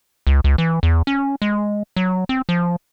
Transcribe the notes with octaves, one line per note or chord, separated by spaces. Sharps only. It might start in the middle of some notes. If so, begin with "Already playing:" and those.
C#2
C#2
E3
E2
C#4
G#3
F#3
C4
F3